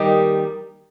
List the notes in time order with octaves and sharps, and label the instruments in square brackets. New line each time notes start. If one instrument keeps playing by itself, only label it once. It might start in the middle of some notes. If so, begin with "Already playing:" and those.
Already playing: [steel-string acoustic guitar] D#2 D#3 G3 [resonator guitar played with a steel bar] D#4 G4